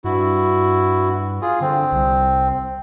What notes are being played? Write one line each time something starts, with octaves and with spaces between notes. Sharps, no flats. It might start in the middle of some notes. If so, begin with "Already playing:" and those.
G2 E4 F#4
F4 G#4
D3 C4
C2